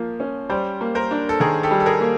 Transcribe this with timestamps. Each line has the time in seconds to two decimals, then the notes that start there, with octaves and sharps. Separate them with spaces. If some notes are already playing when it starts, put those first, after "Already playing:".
Already playing: F3 A#3
0.20 C#4
0.49 G3 C5 D5
0.81 A#3
0.95 A#4 C5
1.11 D4
1.29 A4
1.40 D#3 G#4 A#4
1.63 G4 A4
1.71 G3
1.80 A4
1.86 G#4 A#4
2.00 A#3